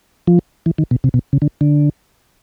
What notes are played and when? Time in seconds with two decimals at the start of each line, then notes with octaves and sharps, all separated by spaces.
0.27 F3
0.66 E3
0.78 D#3
0.91 B2
1.04 C3
1.14 B2
1.33 C#3
1.42 D3
1.61 D3